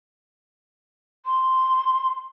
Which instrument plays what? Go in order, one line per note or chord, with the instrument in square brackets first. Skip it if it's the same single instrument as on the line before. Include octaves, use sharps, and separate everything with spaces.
[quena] C6